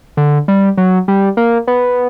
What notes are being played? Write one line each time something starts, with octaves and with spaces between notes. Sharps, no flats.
D3
G3
F#3
G3
A#3
B3